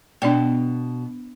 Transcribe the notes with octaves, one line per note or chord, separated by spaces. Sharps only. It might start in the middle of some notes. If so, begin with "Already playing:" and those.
B2 D4 D5 G5